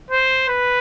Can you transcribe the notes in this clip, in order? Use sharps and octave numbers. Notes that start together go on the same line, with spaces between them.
C5
B4